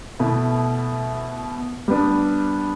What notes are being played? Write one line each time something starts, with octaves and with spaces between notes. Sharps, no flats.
B2 A3 E4
G3 B3 D4